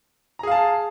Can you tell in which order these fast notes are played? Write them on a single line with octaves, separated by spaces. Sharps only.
A#5 G#4 F5 A5